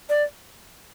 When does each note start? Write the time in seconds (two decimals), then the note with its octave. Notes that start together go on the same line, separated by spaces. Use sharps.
0.09 D5